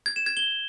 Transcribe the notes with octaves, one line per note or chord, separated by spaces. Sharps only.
G#6
E7
G#6
G7